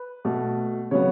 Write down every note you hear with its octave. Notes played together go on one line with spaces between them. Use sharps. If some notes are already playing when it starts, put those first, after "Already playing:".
Already playing: B4
B2 A3
C#3 F#3 B3 C#5